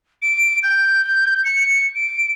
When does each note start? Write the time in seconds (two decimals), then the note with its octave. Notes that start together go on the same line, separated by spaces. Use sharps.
0.22 D7
0.63 G6
1.44 C#7
1.95 D7